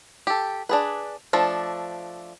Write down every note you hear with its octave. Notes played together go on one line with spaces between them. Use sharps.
G4 A4
D4 G#4 B4
F3 A3 D4